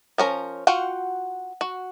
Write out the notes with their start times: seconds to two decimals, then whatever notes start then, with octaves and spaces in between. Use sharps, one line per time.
0.18 F3 C#4 A#4
0.67 F4 F#4 F#5 G5
1.61 F#4